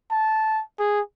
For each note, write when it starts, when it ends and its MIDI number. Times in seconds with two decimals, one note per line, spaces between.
0.11 0.62 81
0.79 1.00 68